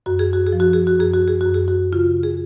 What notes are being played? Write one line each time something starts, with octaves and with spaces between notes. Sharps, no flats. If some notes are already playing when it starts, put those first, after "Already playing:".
F#2 F#4
G#4
F#4
G#4
F3
F#4
G#4
F#4
F#2 G#4
F#4
G#4
F#2 F#4
G#4
F#4
C#3 F4
G#4